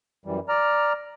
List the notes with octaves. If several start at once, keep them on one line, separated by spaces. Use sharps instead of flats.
F#2 E3 G3
D5 A#5 F6